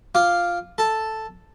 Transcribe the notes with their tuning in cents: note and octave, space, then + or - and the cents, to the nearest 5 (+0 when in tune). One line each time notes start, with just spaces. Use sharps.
F4 +0 F5 +0 D6 +0
A4 +0 A5 +0